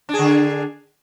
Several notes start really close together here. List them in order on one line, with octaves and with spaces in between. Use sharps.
D4 G#4 D3